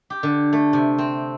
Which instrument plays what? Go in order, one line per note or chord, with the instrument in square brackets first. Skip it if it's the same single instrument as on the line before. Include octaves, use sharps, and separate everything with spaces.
[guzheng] G4
D3
A3
C3
C4